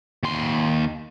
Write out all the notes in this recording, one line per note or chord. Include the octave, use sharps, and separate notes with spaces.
D#2 C6